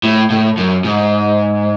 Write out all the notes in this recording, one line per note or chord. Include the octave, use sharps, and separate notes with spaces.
A2
A2
F#2
G#2